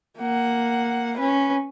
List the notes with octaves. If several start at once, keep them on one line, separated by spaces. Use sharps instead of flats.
A#3 F#5
C#4 B4